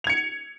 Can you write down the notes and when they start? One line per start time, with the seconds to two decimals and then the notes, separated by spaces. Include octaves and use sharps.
0.04 F7
0.07 G#6
0.09 C#7